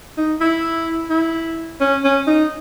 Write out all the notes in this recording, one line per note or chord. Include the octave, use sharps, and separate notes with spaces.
D#4
E4
E4
C#4
C#4
D#4